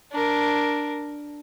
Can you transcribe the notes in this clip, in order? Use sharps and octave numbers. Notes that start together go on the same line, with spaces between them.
D4 A#4